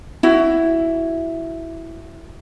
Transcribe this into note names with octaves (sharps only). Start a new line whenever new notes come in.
E4 F#4